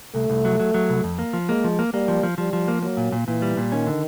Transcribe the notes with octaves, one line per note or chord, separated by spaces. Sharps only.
C2 A3
C2
F#3
F#3
F#3
C2
F2
A#3
F3
G#3 A#3
F3
A#3
G3 A#3
F3
F3
F3 G3
F3
A#3
F#3 A#3
A#2
A#2
A#2 E3
G3
A#2
D#3 C#4
D3